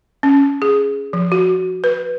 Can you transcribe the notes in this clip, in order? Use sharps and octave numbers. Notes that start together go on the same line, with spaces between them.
C#4
G#4
F3
F#4
B4